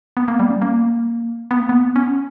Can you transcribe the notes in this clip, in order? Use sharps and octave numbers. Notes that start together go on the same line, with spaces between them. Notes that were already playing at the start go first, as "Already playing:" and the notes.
B3
A#3
G3
C#4
A#3
B3
A#3
B3
C#4